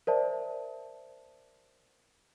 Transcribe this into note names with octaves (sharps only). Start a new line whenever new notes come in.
A#4 C5 D5 E5 A5